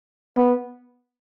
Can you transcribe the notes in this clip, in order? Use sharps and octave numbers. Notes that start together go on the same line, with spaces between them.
B3